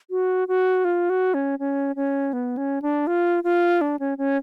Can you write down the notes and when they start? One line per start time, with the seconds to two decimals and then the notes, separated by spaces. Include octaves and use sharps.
0.10 F#4
0.48 F#4
0.85 F4
1.10 F#4
1.34 C#4
1.59 C#4
1.96 C#4
2.33 B3
2.57 C#4
2.82 D4
3.07 F4
3.44 F4
3.81 D4
3.99 C#4
4.18 C#4